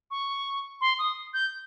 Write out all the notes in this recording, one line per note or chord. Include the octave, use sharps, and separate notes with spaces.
C#6
C6
D#6
G6